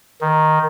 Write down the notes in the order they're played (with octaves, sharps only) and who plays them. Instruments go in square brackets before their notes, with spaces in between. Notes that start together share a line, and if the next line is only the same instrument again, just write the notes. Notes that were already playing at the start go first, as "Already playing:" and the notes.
[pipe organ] D#3